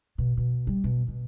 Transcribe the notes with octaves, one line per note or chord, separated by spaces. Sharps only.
B2
B2
G3
B2
B2